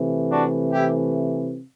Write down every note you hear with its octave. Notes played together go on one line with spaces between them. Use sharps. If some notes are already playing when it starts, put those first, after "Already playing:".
Already playing: C3 E3 A3
D4 F#4
E4 G4